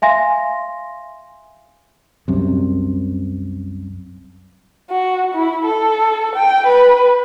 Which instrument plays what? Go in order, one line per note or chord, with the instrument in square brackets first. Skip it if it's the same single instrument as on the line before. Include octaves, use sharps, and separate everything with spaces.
[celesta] E5 F5 G#5 C6 A#6
[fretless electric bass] C2 F#2 C3
[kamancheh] F#4
E4
A4
G5
B4